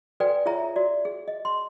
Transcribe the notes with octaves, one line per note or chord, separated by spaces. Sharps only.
F#4 A4 B4 D5 G5 G#5
F4 G#4 C#5 E5 A#5
F#4 D5
G#4
D#5
C6